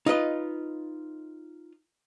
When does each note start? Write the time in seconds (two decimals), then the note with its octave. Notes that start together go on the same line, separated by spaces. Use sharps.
0.06 D#4 F4 B4 D#5